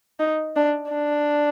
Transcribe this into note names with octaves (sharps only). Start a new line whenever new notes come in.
D#4
D4
D4